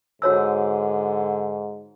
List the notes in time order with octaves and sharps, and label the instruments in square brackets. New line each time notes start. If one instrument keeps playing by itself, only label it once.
[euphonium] G#2 [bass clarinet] D3 [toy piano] F#4 C#5 E6